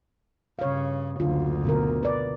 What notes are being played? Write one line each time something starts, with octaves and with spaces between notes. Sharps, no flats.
G2 C#3 C#5 F5
F#1 D2 D3 F4
B2 D3 A#4
B4 D5